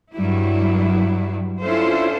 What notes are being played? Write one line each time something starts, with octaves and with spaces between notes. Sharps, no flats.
G2 F#3 G3 E4
C#4 D4 E4 F4 A4 C5